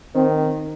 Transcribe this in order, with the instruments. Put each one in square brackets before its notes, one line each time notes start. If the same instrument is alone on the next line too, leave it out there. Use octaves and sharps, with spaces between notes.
[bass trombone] D#3 [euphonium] C4